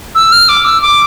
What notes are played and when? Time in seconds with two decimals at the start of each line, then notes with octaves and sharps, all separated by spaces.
0.15 E6
0.32 F6
0.49 D6
0.65 E6
0.82 D6